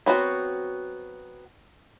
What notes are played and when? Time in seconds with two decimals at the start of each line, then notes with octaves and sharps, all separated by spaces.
0.06 F#3 B3 C4 F#4